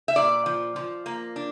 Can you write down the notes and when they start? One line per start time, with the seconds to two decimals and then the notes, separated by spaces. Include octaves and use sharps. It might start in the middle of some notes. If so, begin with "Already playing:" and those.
0.08 E5
0.16 A#2 D5
0.46 F3
0.76 F3
1.06 A#3
1.36 D4